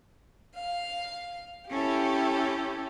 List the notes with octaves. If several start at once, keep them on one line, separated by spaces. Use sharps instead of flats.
F5
C#4 E4 G4 A4